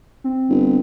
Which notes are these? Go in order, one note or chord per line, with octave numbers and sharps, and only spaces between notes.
C4
G1